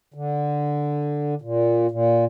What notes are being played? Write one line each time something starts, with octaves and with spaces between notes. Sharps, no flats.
D3
A#2
A#2